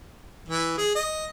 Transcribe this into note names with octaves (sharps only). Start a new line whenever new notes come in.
E3
G#4
D#5